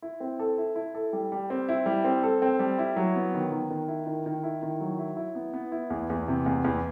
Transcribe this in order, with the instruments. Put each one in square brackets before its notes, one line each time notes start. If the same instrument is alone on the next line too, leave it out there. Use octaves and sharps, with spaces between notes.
[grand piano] E4
C4
A4
E4
E4
A4
G3
G3
C4
E4
G3
C4
A4
C4
G3
E4
F#3
B3
D#3
D#3
D#3
E4
D#3
D#3
E4
D#3
F#3
E4
E4
B3
B3
E4
E2
E2
C3
E2
E2